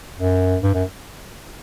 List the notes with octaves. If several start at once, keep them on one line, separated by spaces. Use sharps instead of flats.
F#2
G2
F#2